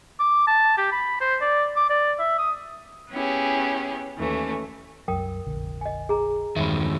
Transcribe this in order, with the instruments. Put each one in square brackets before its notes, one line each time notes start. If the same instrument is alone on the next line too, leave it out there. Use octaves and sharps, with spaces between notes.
[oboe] D6
A5
G4
B5
C5
D5
D6
D5
E5
D#6
[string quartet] B3 C#4 E4 G4 G#4
D#2 E3 A3 C#4
[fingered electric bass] C2 F#2 F#3 [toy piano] A#4 G5 D#6
[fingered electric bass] F1 A#1 D3
[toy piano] D#5 G#5
G#4 A#5
[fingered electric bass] E2 [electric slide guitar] G2 D#3 [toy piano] E5 B5